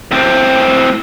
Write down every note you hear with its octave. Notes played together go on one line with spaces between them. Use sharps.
A2 C4